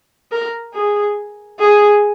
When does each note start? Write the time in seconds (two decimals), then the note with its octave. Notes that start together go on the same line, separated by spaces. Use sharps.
0.32 A#4
0.74 G#4
1.59 G#4